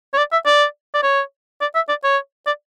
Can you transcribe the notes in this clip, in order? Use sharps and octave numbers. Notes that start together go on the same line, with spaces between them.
C#5
D5
E5
D5
D5
C#5
D5
E5
D5
C#5
D5